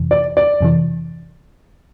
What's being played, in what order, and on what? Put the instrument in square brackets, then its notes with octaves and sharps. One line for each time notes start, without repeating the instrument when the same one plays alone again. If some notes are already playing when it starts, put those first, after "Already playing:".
Already playing: [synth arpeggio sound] F2 C3 E3
[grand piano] D5
D5
[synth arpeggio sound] F2 C3 E3